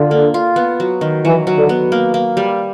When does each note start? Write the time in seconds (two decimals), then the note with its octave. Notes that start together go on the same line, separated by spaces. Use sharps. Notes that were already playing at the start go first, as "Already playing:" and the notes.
Already playing: D3 F4
0.11 A#3
0.34 F4
0.56 B3
0.80 F#3
1.01 D#3
1.24 E3 F#3
1.47 F#3
1.58 D3
1.69 B3
1.92 A#3
2.14 A#3
2.37 G3